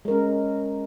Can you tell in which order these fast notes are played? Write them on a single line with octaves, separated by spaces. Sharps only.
G#3 A#4 C#4